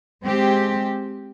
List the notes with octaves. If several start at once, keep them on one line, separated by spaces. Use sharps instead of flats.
G#3 C4 G4